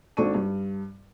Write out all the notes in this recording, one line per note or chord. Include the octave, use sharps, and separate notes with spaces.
G#1 D4 A4 A5 C#6 D#7
G2